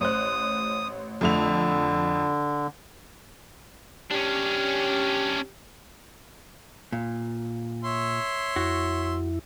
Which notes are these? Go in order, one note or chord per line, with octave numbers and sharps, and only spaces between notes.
A1 C5 D#6 F#6
F2 D3 A3 F7
C#4 D4 G4
A#2
C#5 E5 C6
F2 E4 F#4